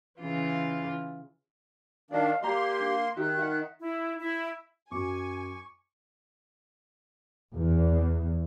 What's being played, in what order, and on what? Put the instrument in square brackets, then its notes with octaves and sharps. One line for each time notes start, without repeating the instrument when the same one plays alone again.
[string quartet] C#3 E3 F4
[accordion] D#3 D4 [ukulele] D5 D#5 [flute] F5
[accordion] A#3 C6 [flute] G4 [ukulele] D5 A#5
[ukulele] D4
[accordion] D#3 [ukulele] D#4 G4 E5 [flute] F#6
[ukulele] E5 F#5
[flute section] E4
E4
[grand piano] F#2 [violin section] G#5 [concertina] C#6 [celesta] D6
[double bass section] E2